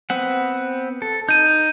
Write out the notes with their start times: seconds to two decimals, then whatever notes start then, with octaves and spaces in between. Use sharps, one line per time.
0.10 B3 C4 F#5
1.02 A4
1.29 D#4 G6 D#7